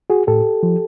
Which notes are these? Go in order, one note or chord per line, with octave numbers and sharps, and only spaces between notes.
F#4 G#4
A2 G4 A4
F3